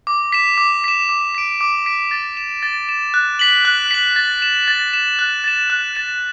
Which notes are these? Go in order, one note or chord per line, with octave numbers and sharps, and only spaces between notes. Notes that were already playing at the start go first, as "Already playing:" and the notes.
D6
B6 E7
D6
B6 E7
D6
B6 D7
D6
B6 D7
A6
E7
A6
E7
F#6
B6 F#7
F#6
B6 F#7
A6
E7
A6
E7
F#6
A6 E7
F#6
A6 E7